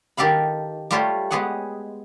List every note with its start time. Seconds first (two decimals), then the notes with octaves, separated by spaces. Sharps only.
0.17 D#3 G4 A4 F5 B5
0.91 G3 A3 F4 G4 C5 C#5
1.31 G#3 B3 G4 G#4 C#5 F#5